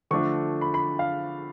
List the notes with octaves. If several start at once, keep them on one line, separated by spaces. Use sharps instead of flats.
D3 F3 A3 D4 C#6
B5
B5
F5